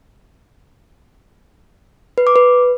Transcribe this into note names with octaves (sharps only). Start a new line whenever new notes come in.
B4
D6
B4